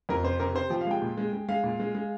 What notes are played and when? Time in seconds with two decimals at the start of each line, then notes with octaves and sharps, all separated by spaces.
0.09 F2 A#4
0.23 C3 C5
0.40 C3 A#4
0.55 C3 C5
0.70 F3 G5
0.81 F5
0.87 G#3 G5
1.02 A#2
1.17 G#3
1.33 G#3
1.48 G#3 F5
1.63 A#2
1.80 G#3
1.95 G#3